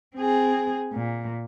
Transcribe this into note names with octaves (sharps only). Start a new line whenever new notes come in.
C4 G#4
A#2